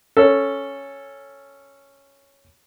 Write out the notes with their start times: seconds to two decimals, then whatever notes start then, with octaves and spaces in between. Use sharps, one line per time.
0.17 C#4 A4